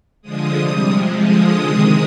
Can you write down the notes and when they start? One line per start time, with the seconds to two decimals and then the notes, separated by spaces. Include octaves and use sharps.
0.22 D3 F3 G#3 D#6
0.56 C3 G3
0.89 C3 F3 G#3
1.23 D3 F3 G#3 D#6
1.57 C3 D#3 G#3